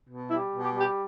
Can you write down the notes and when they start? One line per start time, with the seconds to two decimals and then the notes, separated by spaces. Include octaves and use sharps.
0.08 B2
0.31 G3 E4
0.53 B2
0.64 G4
0.75 G3
0.80 G4